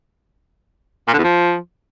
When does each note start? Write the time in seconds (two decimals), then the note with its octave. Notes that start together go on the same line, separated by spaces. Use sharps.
1.08 A#2
1.13 D3
1.19 E2
1.24 F3